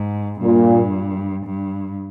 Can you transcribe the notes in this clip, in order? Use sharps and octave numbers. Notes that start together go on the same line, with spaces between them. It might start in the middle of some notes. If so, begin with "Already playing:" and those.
Already playing: G#2
G2 A#2
G2